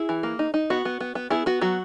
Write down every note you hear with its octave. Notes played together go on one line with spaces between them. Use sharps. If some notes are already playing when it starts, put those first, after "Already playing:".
Already playing: E4 G#4
E3
A#3
D#4
D#4
B3 F#4
B3
B3
B3
B3 E4 G#4
B3 F#4
F#3 F#4